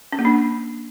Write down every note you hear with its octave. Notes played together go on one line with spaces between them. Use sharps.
C#4
A#3
D4